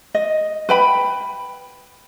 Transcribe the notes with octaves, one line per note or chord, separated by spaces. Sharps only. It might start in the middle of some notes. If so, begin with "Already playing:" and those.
D#5
B4 G5 B5